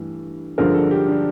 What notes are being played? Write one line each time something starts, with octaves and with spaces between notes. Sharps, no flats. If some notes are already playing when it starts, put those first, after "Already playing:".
Already playing: G2 E3 A3
G2 D3 F3 G#3 A#4
A4
G4
D4